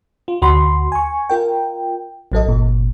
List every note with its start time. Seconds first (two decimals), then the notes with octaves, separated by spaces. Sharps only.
0.28 F4
0.42 D2 F#4 B5 C6
0.92 G#5 C#6
1.30 F4 A#4 G5
2.32 A1 F#3 A4 D#5
2.46 G1 A#2